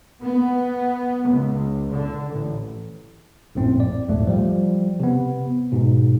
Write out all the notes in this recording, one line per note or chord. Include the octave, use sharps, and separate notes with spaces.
B3
C#2
D3
A1
A#1 F#2 A2 C4
D5
A#1 E2 G#2 A3
F3 G3
C3 B3
G#2 B2